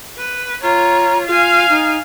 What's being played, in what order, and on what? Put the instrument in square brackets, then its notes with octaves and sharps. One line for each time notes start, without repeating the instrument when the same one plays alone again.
[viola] B4
[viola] F4 C#5 [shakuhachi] A#5
[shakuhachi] F4 [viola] F5 G#5
[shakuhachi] D#4